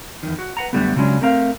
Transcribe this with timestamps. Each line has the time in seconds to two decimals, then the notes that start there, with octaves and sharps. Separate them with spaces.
0.23 E2 D#3
0.39 F#4
0.57 B4 F#5 A#5
0.73 F#2 D3 E3 G3 A3 B3
0.96 C#3 F#3 G#3 C#4 D4
1.21 A3 C4 A#4 F5